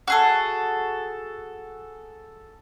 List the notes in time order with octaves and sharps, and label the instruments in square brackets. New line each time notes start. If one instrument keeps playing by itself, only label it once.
[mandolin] F#4 G#4 A4